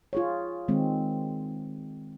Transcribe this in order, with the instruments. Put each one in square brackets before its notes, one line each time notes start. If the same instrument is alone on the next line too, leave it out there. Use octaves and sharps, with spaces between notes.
[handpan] F4 G#4 C#5
D#3 G#3 C4